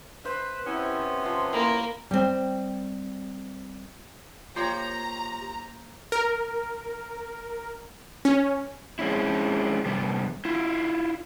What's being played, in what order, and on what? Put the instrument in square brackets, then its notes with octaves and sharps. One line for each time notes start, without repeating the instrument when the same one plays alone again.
[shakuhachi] B4 [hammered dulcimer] C5 E5
[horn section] C3 B3 C#4 [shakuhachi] E4
[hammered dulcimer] F3 E5 [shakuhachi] C6
[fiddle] A#3 [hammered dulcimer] E4
[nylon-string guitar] G3 C4
[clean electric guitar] A#3 C5 [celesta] F4 [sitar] G4 C#5 [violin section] A#5
[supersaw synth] A#4
C#4
[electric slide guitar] G#3 C4 C#4 E4
G2 C3 G3 B3
E4 F4